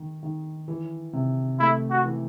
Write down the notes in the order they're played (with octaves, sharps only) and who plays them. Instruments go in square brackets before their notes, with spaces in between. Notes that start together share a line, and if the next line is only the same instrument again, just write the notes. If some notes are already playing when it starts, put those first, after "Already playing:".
Already playing: [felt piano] D#3
D#3
E3
C3
[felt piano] A3 [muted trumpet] E4
[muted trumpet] F#4
[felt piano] E3